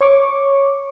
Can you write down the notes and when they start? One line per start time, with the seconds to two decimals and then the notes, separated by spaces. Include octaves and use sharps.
0.01 C#5 C#6 D6